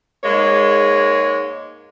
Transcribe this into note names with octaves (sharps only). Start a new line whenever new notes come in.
G#2 G#3 A#3 C#5